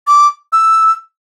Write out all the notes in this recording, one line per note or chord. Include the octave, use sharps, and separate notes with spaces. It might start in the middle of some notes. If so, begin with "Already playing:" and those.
D6
E6